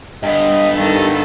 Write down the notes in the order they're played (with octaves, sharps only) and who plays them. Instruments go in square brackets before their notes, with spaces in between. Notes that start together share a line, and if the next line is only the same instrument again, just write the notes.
[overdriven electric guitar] G2 B3 [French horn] D#5
[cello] D#3 A4 [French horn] G3